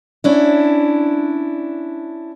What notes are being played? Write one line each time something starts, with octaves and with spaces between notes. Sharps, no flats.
C#4 D4 E4